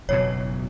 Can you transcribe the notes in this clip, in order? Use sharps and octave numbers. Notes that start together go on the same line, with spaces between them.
F#1 E2 B2 F#3 C#5